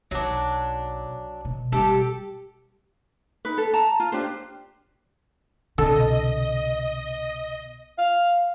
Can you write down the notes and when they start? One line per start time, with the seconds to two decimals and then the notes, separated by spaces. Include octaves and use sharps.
0.11 B1 F#3 D4
1.45 B2
1.72 B2 G3 G4 A4
3.45 D#4 B4
3.58 A4
3.74 A5 A#5
4.00 F4
4.12 D4 G4 C5
5.78 C2 B2 D3 A4 D#5
7.98 F5